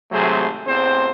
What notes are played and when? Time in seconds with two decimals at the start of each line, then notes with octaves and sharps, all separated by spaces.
0.12 G#1 C3 F#3 A3 G#4 C5
0.67 A1 E2 C4 C5